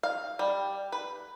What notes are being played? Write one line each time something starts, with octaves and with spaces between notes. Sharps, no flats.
F5
G3
B4